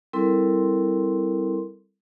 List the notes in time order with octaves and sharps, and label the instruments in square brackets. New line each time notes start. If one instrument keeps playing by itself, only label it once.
[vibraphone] G3 C4 E4 A4 A#4 C6